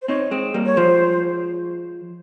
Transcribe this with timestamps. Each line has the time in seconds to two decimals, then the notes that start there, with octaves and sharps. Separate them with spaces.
0.02 C5
0.08 C4 D#4 C#5
0.31 G#3 C4
0.54 G3 A#3
0.66 C#5
0.77 F3 G#3 C5